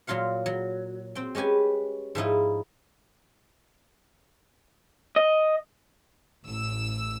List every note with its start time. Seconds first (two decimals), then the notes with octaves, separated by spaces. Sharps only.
0.07 A#2 F#3 F4 F5 F#5
0.46 F#3
1.15 C4 G5
1.35 G#3 C#4 G4 B4 G#5
2.15 G#2 F3 D#4 E4
5.16 D#5
6.45 A1 E6